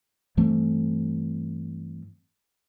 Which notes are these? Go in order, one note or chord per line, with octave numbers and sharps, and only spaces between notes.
G2 E3 A3 C4